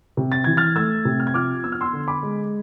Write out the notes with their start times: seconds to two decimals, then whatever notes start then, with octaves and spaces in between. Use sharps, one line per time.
0.17 C3
0.32 A6
0.44 E3 G#6
0.57 F6 A6
0.76 A3 E6 G#6
1.05 C3
1.20 F6
1.27 G#6
1.34 F3 D6 F6
1.64 B3 E6
1.72 F6
1.81 C6 E6
1.93 D3
2.08 B5 D6
2.23 G#3